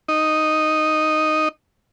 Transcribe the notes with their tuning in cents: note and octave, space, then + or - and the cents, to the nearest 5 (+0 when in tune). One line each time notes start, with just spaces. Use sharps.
D#4 -5